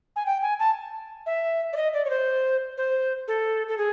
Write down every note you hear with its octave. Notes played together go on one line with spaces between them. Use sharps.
G#5
G5
G#5
A5
E5
D5
D#5
D5
C#5
C5
C5
A4
A4
G#4